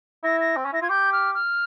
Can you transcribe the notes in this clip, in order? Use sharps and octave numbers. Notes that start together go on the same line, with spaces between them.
E4 A#6
A#6
C4
C#4
E4 A#6
F4 G#6
G4 G6
F6
F6